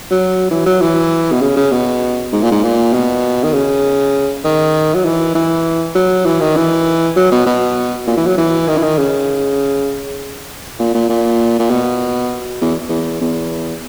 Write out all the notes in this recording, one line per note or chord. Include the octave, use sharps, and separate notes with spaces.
F#3
E3
F#3
E3
B2
C#3
C#3
B2
G#2
A#2
G#2
A#2
B2
D#3
C#3
D#3
F#3
E3
E3
F#3
E3
D#3
E3
F#3
B2
B2
A#2
E3
F#3
E3
D#3
E3
D#3
C#3
A#2
A#2
A#2
A#2
B2
E2
E2
E2